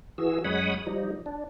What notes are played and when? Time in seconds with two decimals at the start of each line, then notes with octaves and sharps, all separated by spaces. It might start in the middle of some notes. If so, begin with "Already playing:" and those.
0.18 E3 F#4 G#4 E6
0.44 F#2 G#3 C#5 F#5 B5 D#6
0.87 F3 G3 D#4
1.26 D4